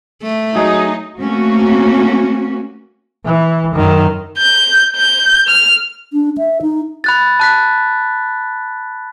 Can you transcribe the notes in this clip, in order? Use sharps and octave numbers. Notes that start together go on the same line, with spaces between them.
A3
F#3 D#4 G#4 D#5
A3 A#3 C4 C#4 F#4
E3
F#2 D#3
G6
G6
F6
D4
E5
D#4
B5 F#6 A6
A5 F#6 B6